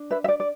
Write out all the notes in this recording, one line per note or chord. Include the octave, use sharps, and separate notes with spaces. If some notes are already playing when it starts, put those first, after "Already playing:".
Already playing: D4
B4 E5
E5
D5
D5